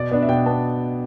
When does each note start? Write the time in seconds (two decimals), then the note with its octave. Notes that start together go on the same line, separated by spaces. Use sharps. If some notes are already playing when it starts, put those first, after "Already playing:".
Already playing: B2 D5
0.12 B3 D4
0.23 E5
0.29 B2 G5
0.46 B3 A5